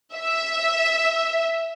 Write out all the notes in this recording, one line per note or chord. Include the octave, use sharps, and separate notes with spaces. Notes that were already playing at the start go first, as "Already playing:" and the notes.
E5